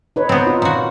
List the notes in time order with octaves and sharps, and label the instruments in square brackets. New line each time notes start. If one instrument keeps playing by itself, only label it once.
[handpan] D#4 B4 C#5
[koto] B3 C4
[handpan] D#4 F4
[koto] A#2 F#4